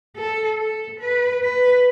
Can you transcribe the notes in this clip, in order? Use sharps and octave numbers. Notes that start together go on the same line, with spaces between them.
A4
A4
B4
B4